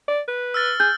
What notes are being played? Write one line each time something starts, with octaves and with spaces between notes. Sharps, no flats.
D5
B4
E6 F6 A6
G#4 G6